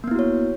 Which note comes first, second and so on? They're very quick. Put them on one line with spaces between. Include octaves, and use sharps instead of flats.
A#3 B3 E4 F#4 C#5